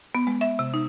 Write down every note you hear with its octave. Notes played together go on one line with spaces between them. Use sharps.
B3
G#3
E5
C3
D#4